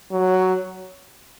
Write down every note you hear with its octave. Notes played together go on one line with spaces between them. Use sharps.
F#3